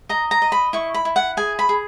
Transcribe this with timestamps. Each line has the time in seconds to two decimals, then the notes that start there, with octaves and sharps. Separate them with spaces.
0.09 D#5 A#5
0.31 A#5
0.42 D#5
0.52 B5
0.73 E4 C#6
0.94 B5
1.05 E4
1.16 F#5
1.37 G#4 G#5
1.59 B5
1.69 G#4